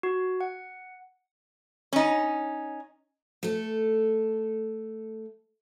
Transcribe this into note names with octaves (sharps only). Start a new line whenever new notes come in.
F#4
F#5
C#4 D#4
A3 A4